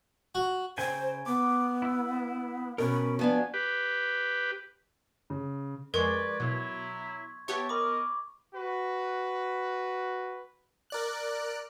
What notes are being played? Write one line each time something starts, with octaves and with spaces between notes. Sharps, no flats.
F#4
C#3 C5 G5 G#5
B3 D6
E4 E6
B2 C#4 A#4 B4 B5
F3 F#3 B3 D4 F#4 G#5
G4 B4
C#3
F2 G#3 A#4 B4 D5 C6 C#6 G#6
B2 F#3 E4
B3 G4 C#5 E5 G5 A5 C#6
A#4 D#5 B5 D6
F#4 B4
A#4 D5 F#6